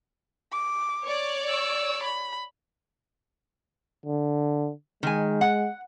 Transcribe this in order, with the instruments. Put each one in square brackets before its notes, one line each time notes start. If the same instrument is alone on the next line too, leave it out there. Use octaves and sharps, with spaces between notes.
[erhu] D6
[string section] C#5 D5
[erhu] E6
B5
[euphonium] D3
[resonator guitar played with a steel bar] D#3 G#5 [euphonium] G#3
[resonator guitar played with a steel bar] F#5